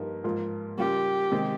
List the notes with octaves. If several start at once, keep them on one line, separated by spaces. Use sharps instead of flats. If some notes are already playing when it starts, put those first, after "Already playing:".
Already playing: G2 F3 A#3 D#4
G#2 F3 A#3 F4
C#3 G3 A#3 F4 G4
C3 D#3 G#3 C4